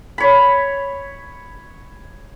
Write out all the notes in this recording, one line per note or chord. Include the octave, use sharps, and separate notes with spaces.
C#5 B5